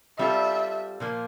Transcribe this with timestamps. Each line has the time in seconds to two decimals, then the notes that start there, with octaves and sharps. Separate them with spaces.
0.19 G3 C4 F4 A4 E5
1.00 A#2 F3 A#3